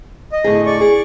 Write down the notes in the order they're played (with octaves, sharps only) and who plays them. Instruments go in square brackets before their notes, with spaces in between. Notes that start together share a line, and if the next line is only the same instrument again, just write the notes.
[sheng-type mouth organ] D#5
[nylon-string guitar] A2 D3 G#4
[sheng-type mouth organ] D5 C#6
[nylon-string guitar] G#4